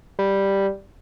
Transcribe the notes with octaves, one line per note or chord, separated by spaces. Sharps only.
G3